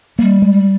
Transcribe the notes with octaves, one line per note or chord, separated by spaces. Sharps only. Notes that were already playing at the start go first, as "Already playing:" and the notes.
G3 A#3
G#3